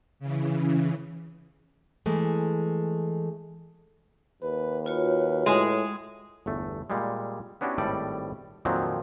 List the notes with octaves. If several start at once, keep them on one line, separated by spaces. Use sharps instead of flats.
C#3 E3
E3 G#3 A3
D#2 B4
F4 F#4 B4 C#5
A2 G#3 G#4
G1 E2 A3
A#2 G3 G#3
B3 C#4 D4 E4 F#4 G4
G#1 A2 G3 A4 D5
F2 A#2 D#3 F3 F#3 C4